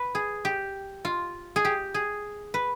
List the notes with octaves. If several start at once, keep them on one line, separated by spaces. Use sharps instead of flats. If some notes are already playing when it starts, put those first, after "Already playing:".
Already playing: B4
G#4
G4
F4
G#4
G4
G#4
B4